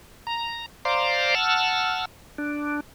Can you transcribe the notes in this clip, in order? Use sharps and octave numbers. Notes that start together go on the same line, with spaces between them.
A#5
C5 D5 F5 A#5 C6 D6
F#5 A5 E6 F6
D4